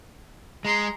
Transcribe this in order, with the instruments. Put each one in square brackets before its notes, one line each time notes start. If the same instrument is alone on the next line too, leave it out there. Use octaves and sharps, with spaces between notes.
[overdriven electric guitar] G#3 [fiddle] A#5 C6